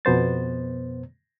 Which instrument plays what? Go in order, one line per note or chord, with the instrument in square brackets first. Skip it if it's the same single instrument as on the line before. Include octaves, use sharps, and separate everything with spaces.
[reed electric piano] F2 B2 B3 C5 A6